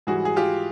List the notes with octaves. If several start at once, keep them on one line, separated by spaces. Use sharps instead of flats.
G#2 E3 G3 F#4 G#4
G#4
F4 G4